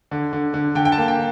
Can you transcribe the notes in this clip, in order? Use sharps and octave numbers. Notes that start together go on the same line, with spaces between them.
D3
D3
D3
D3 G5
G5
A5
A#3
G5